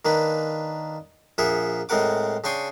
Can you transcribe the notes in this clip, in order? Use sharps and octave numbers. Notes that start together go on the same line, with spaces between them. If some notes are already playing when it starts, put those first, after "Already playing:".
D#3 A#3 D4 B4
A#1 A#2 G#4 A#4 E5 F#5
A2 G#3 C4 A#4 F#5 D6
C#3 D4 G5 C6 C#6 D#6